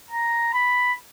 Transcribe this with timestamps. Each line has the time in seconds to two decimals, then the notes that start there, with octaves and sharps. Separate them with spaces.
0.11 A#5
0.54 B5